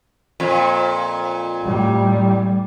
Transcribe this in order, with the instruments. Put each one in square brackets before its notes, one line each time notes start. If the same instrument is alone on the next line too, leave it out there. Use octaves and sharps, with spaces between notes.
[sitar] F2 A#2
[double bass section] A2 G3